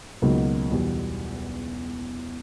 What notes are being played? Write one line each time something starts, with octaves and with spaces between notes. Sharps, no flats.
C#2 B2 F#3 A#3 D#4
E2 B2 G3